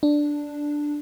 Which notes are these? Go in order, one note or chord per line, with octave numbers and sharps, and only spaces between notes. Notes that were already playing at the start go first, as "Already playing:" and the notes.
D4